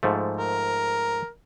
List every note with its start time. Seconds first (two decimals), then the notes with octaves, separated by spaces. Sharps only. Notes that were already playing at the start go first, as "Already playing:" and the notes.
0.03 G#2 F3 A3
0.37 A#4